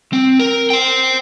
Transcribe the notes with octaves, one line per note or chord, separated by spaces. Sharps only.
C4
A#4
C5 G5